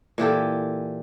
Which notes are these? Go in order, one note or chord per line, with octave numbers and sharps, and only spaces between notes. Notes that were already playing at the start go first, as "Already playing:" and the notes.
A#2 E3 G4 A4